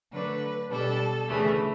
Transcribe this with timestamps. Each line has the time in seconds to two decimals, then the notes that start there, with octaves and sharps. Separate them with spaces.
0.12 D3 F#3 A3 D4 B4
0.70 B2 G3 D4 A4
1.27 D2 C#3 E3 A3